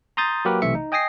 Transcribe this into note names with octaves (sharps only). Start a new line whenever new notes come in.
A#5 C6 D#6 G6 A6
F#3 A#3 F#4 G4 A#4 B4
B1 C3 E3 A3 E5 C#7
D#4
D#5 G5 G#5 D#6 A#6 C7